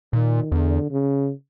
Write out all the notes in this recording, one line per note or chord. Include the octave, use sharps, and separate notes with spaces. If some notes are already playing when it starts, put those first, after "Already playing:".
A#2 D#3
E2 D3
C#3